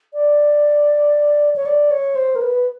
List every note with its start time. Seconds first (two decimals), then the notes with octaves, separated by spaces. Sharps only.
0.14 D5
1.56 C#5
1.66 D5
1.91 C#5
2.15 C5
2.35 A#4
2.41 B4